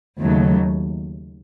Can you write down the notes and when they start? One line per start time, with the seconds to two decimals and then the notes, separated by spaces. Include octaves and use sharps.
0.21 D#2 C#3 F#3 A3